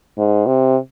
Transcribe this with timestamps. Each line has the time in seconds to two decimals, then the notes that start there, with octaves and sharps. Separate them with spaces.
0.18 G#2
0.47 C3